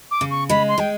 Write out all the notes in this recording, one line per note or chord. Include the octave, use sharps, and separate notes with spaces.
D6
C#3
C#6
G#3 B5
C6
G#3 G5